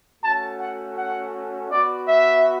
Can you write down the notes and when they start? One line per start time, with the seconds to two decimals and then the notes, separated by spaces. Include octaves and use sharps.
0.23 A3 C#4 F#4 A5
0.60 F#5
0.97 F#5
1.70 B3 F#4 D5
2.08 E5